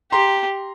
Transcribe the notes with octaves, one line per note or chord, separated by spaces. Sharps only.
G4 A#5 C6